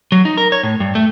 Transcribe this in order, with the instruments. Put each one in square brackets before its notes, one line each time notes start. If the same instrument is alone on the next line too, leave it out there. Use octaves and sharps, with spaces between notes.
[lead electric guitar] F#3
D#4
A#4
C#5
A2
G2
A3